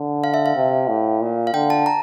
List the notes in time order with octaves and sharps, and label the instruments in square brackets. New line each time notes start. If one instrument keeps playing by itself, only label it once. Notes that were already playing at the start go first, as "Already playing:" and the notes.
Already playing: [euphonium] D3
[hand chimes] F5
E5
F5
[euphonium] C3
A2
A#2
[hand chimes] F5
[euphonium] D3 [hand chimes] G5
[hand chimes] A5
A#5